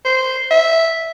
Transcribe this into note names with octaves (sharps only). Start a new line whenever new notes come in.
C5
E5